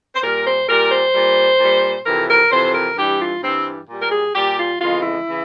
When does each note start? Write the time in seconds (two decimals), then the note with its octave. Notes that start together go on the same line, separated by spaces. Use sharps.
0.16 C5
0.23 A#2 G3 A#4
0.46 C5
0.68 A#2 G3 A#4
0.92 C5
1.14 A#2 G3
1.60 A#2 G3
2.06 F2 C3 E3 A#4
2.28 A#4
2.51 F2 C3 E3 C5
2.75 A#4
2.97 G2 E3 G3 G4
3.20 F4
3.42 G2 E3 G3 C4
3.88 A#2 G3
4.02 A#4
4.11 G#4
4.34 A#2 G3 G4
4.58 F4
4.80 F2 C#3 E3 G#3 F4
5.03 E4
5.28 C#3 E3